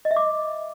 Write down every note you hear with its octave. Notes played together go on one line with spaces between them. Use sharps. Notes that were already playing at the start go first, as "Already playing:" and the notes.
D#5
E5
D6